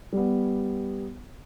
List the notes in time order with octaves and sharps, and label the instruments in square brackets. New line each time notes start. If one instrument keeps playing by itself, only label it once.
[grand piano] G3 B3